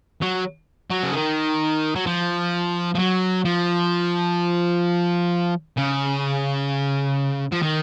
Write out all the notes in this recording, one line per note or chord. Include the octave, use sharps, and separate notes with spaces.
F#3
F#3
C#3
D#3
F#3
F3
F3
F#3
F3
C#3
F3
D#3